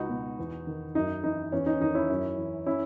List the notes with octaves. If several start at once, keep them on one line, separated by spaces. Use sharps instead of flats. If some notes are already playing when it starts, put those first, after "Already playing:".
Already playing: C#2 D#4 F#4
B2
E2
D#3
F#2 D#4
E3 D#4
E2 C#4
D#4
D#3 D#4
C#4 E4
F#2
E3
C#4 E4